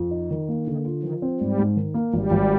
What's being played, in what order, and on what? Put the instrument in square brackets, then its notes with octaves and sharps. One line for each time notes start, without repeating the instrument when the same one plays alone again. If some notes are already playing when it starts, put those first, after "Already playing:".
Already playing: [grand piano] F2
D#4
D#3
A#3
[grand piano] D3 [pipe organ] D#3
[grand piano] F4
[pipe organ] D#3 [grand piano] F3
[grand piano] C4
[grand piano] G#2 [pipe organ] G3
[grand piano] G#2
D#3
A#3
[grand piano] G#1 [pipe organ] G3
[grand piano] G#1